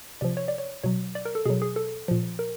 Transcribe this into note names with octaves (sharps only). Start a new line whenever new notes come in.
C3 F3 D5
C#5
D5
C#5
B2 F#3 C#5
D5
A#4
A4
B2 F#3 G#4
G#4
A4
A#2 F3
A#4